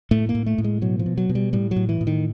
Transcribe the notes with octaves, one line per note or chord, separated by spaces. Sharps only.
A2 A3
A#3
A2
A3
A2
G#3
B2 F#3
F3
B2
F#3
B2
G3
A2 G3
F#3
A2
E3
A2
D#3